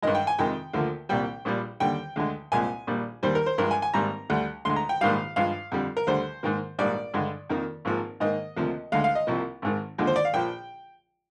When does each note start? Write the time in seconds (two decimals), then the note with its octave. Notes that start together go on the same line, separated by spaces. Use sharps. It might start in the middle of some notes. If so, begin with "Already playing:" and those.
0.02 G2 D#3 G#3 D#5
0.15 G5
0.27 G#5
0.39 F2 C3 D#3 G#3 G5
0.73 D2 D3 F3 A#3
1.09 C2 A#2 G3 G5
1.45 A#1 A#2 G3
1.80 D#2 D3 G3 G5
2.16 D2 D3 G#3
2.52 C2 A#2 F3 G#3 G#5
2.87 A#1 A#2 G3
3.23 D#2 D#3 G3 C5
3.35 A#4
3.46 C5
3.58 G2 F3 G#3 A#4
3.71 G#5
3.82 G#5
3.94 G#1 G#2 G3 A#3 A#5
4.30 D2 D3 G3
4.65 D2 D3 G#3 C6
4.76 A#5
4.89 G5
5.01 A#1 G#2 D#3 G3 F5
5.36 G2 F3 G#3 F5
5.72 F2 D3 G3
5.97 A#4
6.07 D2 D3 G3 C5
6.43 G#2 D#3 A#3
6.79 A#1 G#2 G3 A#3 D5
7.14 G2 D3 G#3
7.50 F2 D#3 A#3
7.85 G#1 G#2 F3 A#3
8.20 G#2 D#3 A#3 D#5
8.56 D2 C3 F3 A#3
8.92 D2 D3 G#3 F5
9.04 F5
9.15 D#5
9.27 C2 C3 F3 A#3
9.62 G#1 G#2 D#3
9.98 D#2 D3 F3 G#3
10.07 C5
10.16 D5
10.25 F5
10.33 A#1 A#2 F3 G5